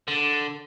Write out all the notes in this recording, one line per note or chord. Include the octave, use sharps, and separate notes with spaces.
D3